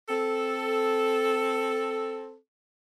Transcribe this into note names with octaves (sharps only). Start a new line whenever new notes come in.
C4 A4